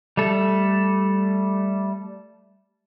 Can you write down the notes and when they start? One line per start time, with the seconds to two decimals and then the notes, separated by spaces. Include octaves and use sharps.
0.17 G3 A3 A4